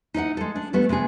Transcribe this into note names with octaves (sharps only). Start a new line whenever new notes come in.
D#4 E4 D#5 F#5
G#3 A4
D4
G3 A3 B3
C3 B3 D4 G#4